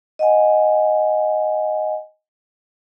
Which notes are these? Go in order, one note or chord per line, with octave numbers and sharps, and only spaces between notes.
D#5 F#5 G#5